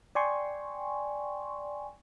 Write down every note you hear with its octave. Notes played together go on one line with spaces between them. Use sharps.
D5 G5 G#5 C6 C#6